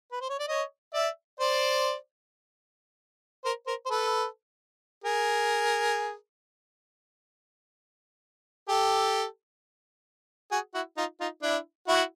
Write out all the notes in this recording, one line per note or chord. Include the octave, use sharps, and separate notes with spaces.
B4
C5
C#5
D5
C#5 D#5
D5 E5
C5 D5
A#4 C5
A#4 C5
C5
A4 B4
G#4 A#4
G4 A4
F#4 G#4
E4 F#4
D#4 F4
D#4 F4
D4 E4
E4 F#4